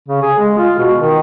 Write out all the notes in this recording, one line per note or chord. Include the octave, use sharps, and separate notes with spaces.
C#3
G#4
G#3
F4
B2
D#3